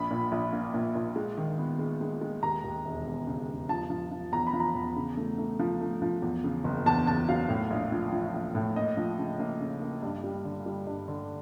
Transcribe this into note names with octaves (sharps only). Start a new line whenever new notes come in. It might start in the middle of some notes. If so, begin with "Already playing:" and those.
Already playing: A#1 B5
A#2
A#1
A#3
A#2
A#2
G#3
D#3
B3
G#3
G#3
G#3
D#2 A#5
D#2
E1
E1
C#3
E1
F3 A5
F3
F3
E2 A#5
B5
F3
A#5
E2
C#3
A3
A3
F3
A3
F3
E2
C#3
F#1
E2 A5
C#3 A5
F#3 F5
A2
A#1
F3
F3
A#1
A2
A#3 D#5
F3
C#3
A#3
C#3
A#3
G2
G3
D3
G3
G2
D3